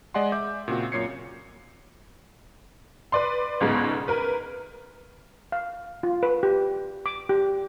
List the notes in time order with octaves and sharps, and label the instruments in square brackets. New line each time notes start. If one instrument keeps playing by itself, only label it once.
[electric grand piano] G#3 D5 D#5 F#5 G#5 C6
E5 D6 G6
A#2 C#3 C4 F#4
F#2 A#2 C#5 G#6 C7 C#7
[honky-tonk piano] B4 D5 C6
G1 C#2 G#2 B2 G#3
A#4 B4
[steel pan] F5
F4
B4
G4
D6
G4